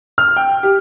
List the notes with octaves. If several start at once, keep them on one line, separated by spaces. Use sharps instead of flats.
F6
G5
G4